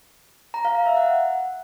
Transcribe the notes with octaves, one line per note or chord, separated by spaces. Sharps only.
A#5
F5
F5
E5
F#5